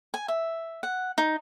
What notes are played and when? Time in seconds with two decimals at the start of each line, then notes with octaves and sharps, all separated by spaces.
0.14 G#5
0.28 E5
0.83 F#5
1.18 D#4